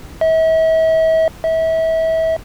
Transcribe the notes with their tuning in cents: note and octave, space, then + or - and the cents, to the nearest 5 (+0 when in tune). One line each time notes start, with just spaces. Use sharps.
E5 -40
E5 -30